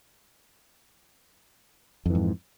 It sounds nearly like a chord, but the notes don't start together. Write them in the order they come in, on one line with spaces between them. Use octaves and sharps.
F2 E3 G#2